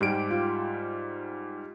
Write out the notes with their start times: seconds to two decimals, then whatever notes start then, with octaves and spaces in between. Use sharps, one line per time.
0.01 G#2 G3 G4 D7
0.31 F4